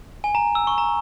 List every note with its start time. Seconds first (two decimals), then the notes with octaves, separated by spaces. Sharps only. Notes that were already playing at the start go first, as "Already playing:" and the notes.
0.24 G#5
0.35 A#5
0.55 E6
0.67 C#6
0.78 A#5